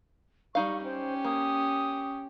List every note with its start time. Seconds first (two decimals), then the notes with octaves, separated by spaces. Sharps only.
0.55 G3 D#4 F5 C#6
0.84 C#4 G4 C5
1.24 A#3 D#6